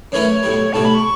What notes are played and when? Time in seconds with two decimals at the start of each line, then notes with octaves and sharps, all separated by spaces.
0.12 F#2 E3 A3 C#4 E4 C#5
0.43 B1 A2 G3
0.73 B1 A2 G3 A5
0.84 B5
0.95 C#6